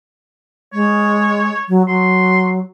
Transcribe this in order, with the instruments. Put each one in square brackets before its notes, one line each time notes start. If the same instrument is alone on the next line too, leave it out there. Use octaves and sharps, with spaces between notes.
[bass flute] G#3 [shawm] C#5
[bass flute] F#3
[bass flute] F#3 [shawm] C6